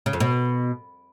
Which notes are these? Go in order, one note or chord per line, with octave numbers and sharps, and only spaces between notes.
C#3
F2
B2